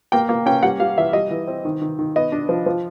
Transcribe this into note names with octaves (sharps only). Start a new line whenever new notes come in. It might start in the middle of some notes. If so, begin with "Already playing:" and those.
A#3 G5
A#3
C#4 G5
G3 F#5
G3 F5
E3 E5
G3 D#5
E3
C4
D#3
D#3
D#3
B3 D#5
D4
F3
F3